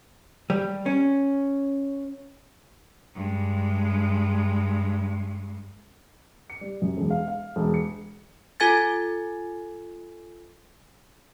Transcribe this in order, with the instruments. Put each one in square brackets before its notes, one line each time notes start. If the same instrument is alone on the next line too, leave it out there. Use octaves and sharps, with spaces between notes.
[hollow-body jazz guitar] G3
C#4
[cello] G2 G#3
[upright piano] C#7
G3
F#2
E1
F5
F5
E1
C#7
[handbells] F4 A4 G#5 G#6 A6